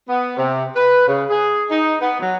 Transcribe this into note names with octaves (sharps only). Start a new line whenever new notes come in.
B3
C3
B4
C#3
G#4
D#4
B3
F#3